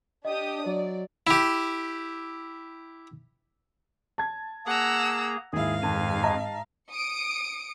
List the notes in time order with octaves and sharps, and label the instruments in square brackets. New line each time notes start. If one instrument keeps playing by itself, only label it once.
[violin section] D4 G4 D#6 [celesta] D#5
[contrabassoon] F#3 [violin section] D5
[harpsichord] E4 G4
[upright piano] A5 G#6
[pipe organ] A#3 G#4 [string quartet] F#5 A#5 E6
[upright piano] D#2 E4 [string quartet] G#2 F5 [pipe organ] G#4
[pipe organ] F2 G#5 [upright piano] D#3 A5
[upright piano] D#5 A5 A#5
[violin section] D#6 C#7 D7